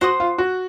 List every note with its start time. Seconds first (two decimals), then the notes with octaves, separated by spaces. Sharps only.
0.01 F#4 C5 F#5 C6 D#6
0.20 F4
0.38 F#4